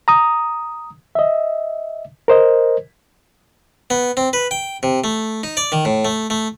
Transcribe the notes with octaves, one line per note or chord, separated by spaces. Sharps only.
A#5 D#6
D#5 E5
A#4 C5 D#5
B3
C4
B4
G5
C3
A3
D#4
D5
D#3
A2
A3
A3